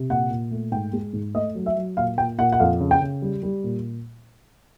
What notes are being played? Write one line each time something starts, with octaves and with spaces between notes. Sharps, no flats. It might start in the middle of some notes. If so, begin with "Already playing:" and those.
Already playing: C3
A#2 F#5
A#2
A3
G#2 G5
G#3
G#2
A3 D#5
F#3
E5
F#3
A#2 F5
A#2 G5
A#2 F#5
F#5
F2 F5
C#3
G5
C#3
G3
G3
A#2